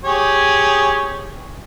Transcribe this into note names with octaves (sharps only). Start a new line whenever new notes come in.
G4 G#4 C#5